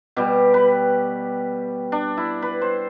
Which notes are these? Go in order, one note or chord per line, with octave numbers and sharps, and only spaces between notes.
B2 G3 G4
B4
D4
E4
B4
C5